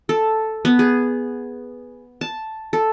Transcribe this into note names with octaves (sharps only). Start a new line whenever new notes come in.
A4
B3
G#4
A5
A4